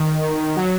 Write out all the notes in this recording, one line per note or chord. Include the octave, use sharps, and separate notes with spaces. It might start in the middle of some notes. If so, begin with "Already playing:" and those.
Already playing: D#3
F#3